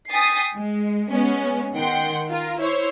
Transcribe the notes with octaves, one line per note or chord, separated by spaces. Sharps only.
G5 G#5 D#6 A6 B6 C7
G#3
G#3 B3 C#4
D#3 F#5 G5 C6
F4 A#4
E4 C5 C#5